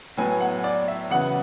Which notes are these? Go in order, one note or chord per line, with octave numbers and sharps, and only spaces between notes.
A2 F#3 B3 G#5
F#5
D5
E5
E2 C#3 F#3 B3 F#5